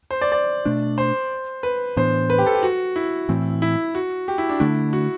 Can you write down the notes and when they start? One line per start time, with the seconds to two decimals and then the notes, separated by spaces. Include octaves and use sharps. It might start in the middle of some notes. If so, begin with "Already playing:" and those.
0.11 C5
0.22 D5
0.32 D5
0.65 B2 A3 D4
0.98 C5
1.63 B4
1.97 A2 E3 B3 D4 C5
2.30 B4
2.38 G4
2.46 A4
2.55 G4
2.63 F#4
2.96 E4
3.29 A2 E3 A3 C4
3.62 E4
3.95 F#4
4.28 G4
4.38 E4
4.49 D4
4.60 D3 A3 D4 E4
4.93 F#4